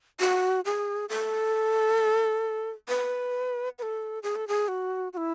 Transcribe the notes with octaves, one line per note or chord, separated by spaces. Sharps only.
F#4
G#4
A4
B4
B4
A4
G#4
A4
G#4
F#4
F#4
E4